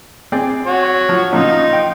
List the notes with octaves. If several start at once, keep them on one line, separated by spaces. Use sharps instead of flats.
C4 G#4 D5
F#4 C#5
F3
A#2 C#3 F3 D#4 F4
G5